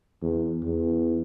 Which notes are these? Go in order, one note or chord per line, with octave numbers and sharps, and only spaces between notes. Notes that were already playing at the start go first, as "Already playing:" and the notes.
E2
E2